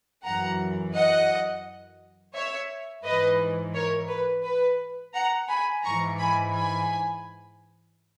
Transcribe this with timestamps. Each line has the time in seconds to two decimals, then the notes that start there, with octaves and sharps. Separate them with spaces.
0.25 F#2 E3 F#5 A#5
0.94 D#5 F#5
2.34 C#5 E5
3.04 G#2 E3 B4 D#5
3.74 A#4 C#5
4.09 B4
4.44 B4
5.14 F#5 A#5
5.49 G#5 B5
5.84 G#2 E3 A#5 C#6
6.19 G#5 B5
6.54 G#5 B5